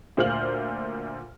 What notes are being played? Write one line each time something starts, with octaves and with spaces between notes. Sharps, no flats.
D2 A#2 C5 F5 F6 F#7